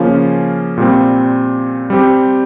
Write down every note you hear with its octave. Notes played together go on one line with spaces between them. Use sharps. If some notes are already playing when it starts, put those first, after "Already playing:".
Already playing: C#3 F3 A#3 C#4 F4
A#2 G3 C4
G3 C4 G4